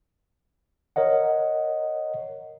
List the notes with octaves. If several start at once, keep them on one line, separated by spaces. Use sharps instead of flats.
A#4 C#5 D#5 F#5